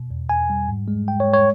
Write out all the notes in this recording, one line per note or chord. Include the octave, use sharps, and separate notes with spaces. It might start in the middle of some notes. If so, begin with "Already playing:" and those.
Already playing: B2
E2
E2 G#5
G3
G#2
G#3
G#2 G5
C#5
G#3
C#5